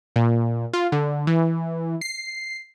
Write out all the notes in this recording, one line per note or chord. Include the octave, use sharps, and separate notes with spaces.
A#2
F4
D3
E3
C7